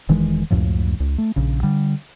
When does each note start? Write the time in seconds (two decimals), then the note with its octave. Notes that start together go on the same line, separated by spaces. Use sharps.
0.09 E1 D#3 E3 G#3
0.50 C#2 F#2 A2 F3
1.00 C#2
1.18 A3
1.36 A#1 C#3
1.63 D3 G3